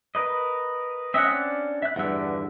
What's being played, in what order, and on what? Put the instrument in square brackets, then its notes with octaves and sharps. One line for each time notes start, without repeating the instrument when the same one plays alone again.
[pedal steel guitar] A#4 B4 D#5
[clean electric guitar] C4 C#4 F#5 [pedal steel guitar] D#5 E5
[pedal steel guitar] D4
E5 F#6
[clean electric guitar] E2 G2 E5 [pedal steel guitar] D3 F#5